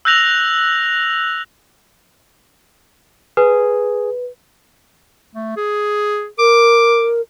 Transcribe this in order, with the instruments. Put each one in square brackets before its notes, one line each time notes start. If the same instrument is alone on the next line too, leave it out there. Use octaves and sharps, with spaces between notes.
[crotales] E6 F#6 G6 A#6 F7 F#7
[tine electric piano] G#4 [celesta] B4
[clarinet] A3
G#4
[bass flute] A#4 [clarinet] D6